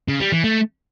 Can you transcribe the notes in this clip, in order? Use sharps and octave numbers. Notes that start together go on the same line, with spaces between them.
C#3
G3
E3
A3